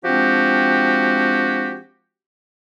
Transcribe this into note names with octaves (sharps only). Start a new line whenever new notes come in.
F3 G#3 C4 D4 F#4 G4